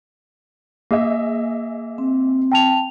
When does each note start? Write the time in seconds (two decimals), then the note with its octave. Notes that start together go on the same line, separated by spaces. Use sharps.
0.91 A#3 G#4 D#5 E5
1.98 C4
2.52 G5 A5 F7